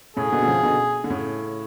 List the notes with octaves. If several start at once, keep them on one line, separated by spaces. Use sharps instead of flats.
A2 C#3 G#4
B2 D3
D3
C#3 F3
B2 D3
D3
A2 C#3